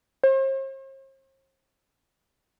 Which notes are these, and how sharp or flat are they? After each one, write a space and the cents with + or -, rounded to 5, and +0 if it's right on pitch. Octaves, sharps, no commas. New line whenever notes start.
C5 +45